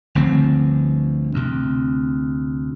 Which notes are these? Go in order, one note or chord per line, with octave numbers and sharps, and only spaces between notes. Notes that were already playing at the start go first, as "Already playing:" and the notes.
G1 D2 F3 C4
D2 C3